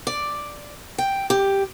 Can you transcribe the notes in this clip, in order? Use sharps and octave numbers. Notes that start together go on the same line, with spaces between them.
D5
G5
G4